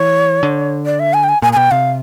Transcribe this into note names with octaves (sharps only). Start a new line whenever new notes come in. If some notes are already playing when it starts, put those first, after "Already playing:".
Already playing: E3 C#5
D3
D5
E5
G#5
G5
G#5
A#2 G#5
G#5
B2 G5
C3 F5